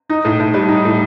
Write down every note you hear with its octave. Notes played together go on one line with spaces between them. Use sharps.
D#4
A2
A2
G3
D#4
A2